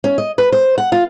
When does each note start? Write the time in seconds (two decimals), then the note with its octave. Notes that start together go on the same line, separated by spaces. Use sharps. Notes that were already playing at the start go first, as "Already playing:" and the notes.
0.04 C#4
0.18 D#5
0.38 B4
0.52 C5
0.78 F#5
0.92 F4